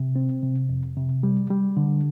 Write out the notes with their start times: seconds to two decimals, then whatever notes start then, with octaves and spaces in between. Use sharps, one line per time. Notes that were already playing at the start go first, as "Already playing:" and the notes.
Already playing: C3
0.16 C4
0.43 C3
0.69 F2
0.97 C3
1.23 G3
1.50 G3
1.77 D3